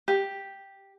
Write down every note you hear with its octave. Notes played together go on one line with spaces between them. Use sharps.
G4